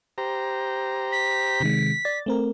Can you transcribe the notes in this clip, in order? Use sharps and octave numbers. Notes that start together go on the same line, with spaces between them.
G4 C5 A#5
B6
C3 D#3 G#3
D5 A6
A3 C4 A#4